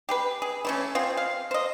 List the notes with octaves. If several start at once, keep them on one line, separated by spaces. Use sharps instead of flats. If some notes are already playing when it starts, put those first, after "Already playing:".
G4 G#4 B4
G#4
E3 A3 C#4
C4 F4 G#4
F5
C5 D#5